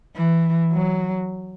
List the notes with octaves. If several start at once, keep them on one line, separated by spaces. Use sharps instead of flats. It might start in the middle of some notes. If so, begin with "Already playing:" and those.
E3
F#3